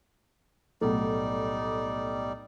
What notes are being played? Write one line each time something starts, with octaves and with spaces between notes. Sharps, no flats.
B1 A2 G3 A3 B3 D#4 D5